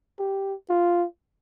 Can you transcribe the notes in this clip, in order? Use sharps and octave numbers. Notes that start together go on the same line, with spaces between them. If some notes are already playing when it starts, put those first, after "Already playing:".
G4
F4